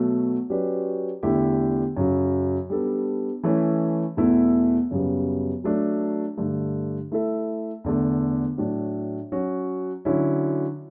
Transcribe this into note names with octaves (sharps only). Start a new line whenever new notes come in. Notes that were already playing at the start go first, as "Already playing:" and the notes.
Already playing: B2 F#3 A3
F#3 C#4 G4 B4 D5
E2 D3 A3 E4 G4
F#2 C#3 F#3
G3 B3 D4 A4 D5
E3 A3 C#4 E4
E2 B2 A3 E4
F#2 C#3 G3 B3
F#3 A3 D4
G2 D3 A3
A3 E4 A4 E5
E2 D3 A3
A2 F#3 A3 D4
F#3 C#4 F#4
D3 F#3 C#4 E4